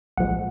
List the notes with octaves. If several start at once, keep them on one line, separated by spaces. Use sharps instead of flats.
B1 A#2 F3 G#3 F#5